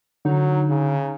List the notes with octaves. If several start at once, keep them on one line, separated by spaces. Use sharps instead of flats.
D3 F#3 D#4
C#3